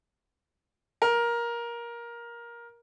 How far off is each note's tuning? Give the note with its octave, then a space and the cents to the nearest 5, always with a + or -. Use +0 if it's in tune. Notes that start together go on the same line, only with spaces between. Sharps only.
A#4 +15